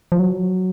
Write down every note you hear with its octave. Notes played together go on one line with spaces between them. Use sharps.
F3
F#3